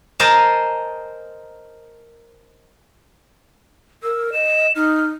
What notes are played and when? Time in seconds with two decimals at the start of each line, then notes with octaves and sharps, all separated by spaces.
0.20 A#4 C5 D#5 G#5 A5
4.03 A#4 E6
4.33 D#5 E7
4.76 D#4 F6